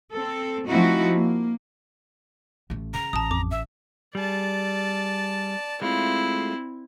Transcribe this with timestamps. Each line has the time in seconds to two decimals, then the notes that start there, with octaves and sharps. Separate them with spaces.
0.13 C4 A4
0.67 F3 A3 C4 D#4 E4 F#4
1.11 A#3
2.70 A1 A3
2.94 C#3 A#5
3.13 A1 A5 D#6
3.31 F2 D6
3.51 E5
4.15 G3 G#4 D5 A5
5.82 G#3 A3 C4 E4 F4